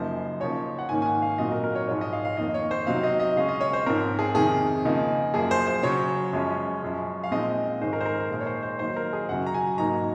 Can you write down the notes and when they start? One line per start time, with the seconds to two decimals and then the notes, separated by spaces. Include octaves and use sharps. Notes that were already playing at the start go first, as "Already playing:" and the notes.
Already playing: F#2 C#3 F3 A#3 D#4 C5
0.40 C#3 F3 A#3 D#4 C#5
0.79 F#5
0.89 G#2 D#3 A#3 C#4 G#5
1.02 G#5
1.06 F#5
1.22 F5
1.38 A#2 F#3 C4 D#4 D#5
1.52 A#4
1.64 A#4
1.75 C#5
1.88 G#2 F3 G#3 C#5
2.01 D#5
2.13 F5
2.25 F5
2.37 F2 D#3 A#3 D#4 D#5
2.54 C#5
2.71 C5
2.87 C3 F#3 C4 D#4 F5
3.03 D#5
3.20 D#5
3.36 C#3 G#3 C#4 F5
3.49 D#5
3.61 C#5
3.73 C5
3.86 G#2 F3 C4 A#4
4.19 G#4
4.35 F2 C3 D#3 G#4
4.85 C#3 F3 A#3 D#4
5.34 F#2 F3 A#3 G#4
5.51 C5
5.67 C5
5.83 C#3 F#3 C#4 C#5
6.33 F#2 F3 G#3 C#4
6.82 F#2 F3 G#3 C#4
7.24 F5
7.31 A#2 F3 G#3 C4 D#4 D#5
7.81 G#2 D#3 G#3 C#4 C5
7.93 A#4
8.00 C5
8.06 A#4
8.18 C5
8.30 A#2 F3 G#3 D#4 A#4
8.41 C#5
8.47 C5
8.63 C5
8.79 D#3 F#3 A#3 D#4 C5
8.96 A#4
9.13 G#4
9.29 F#2 C#3 F#3 F#5
9.46 A#5
9.54 G#5
9.78 G#2 F#3 A#3 D#4 A#5